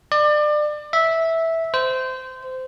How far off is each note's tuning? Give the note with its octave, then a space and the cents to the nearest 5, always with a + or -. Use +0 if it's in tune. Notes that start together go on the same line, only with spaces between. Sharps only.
D5 +30
E5 -10
C5 -20